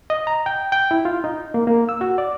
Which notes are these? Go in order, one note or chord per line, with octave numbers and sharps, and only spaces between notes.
D#5
A#5
G5
G5
E4
F4
D#4
A#3
A#3
E6
F#4
D5